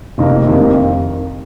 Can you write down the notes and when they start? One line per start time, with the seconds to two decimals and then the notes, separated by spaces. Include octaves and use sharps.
0.18 F1 F2 C3 D#3 A#3
0.47 F1 F2 C3 D#3 A#3